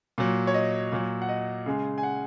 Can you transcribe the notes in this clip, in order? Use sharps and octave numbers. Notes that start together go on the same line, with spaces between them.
A#2 F#3
C#5
D#5
A#2 F#3
F#5
D#5
C#3 G#3
G#5
F#5